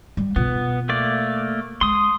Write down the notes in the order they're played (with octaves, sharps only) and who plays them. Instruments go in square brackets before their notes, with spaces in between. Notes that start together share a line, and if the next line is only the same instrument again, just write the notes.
[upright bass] G3
[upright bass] B2 F4 [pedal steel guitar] B3
[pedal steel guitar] A3 A#3 D5
[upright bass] G#3 [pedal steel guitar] C6 D#6